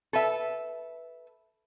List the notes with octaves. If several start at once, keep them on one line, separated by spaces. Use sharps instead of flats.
A4 B4 E5